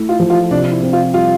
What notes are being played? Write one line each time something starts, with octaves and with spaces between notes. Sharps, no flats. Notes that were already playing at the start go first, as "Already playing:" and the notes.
Already playing: A3 E4 A4
F4
F3
F4
C3 D4
E4
C4
F4
G3 F4